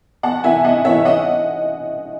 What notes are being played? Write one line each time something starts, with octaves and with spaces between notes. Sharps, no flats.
E2 F#5 A5
C3 E3 E5 G#5
E2 D#5 F#5
C3 E3 C#5 E5
D#5 F#5